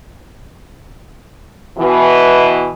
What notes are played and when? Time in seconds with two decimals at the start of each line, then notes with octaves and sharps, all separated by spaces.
1.78 B2 E3